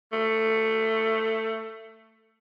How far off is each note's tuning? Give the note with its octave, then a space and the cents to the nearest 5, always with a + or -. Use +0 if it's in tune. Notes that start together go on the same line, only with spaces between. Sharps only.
A3 +15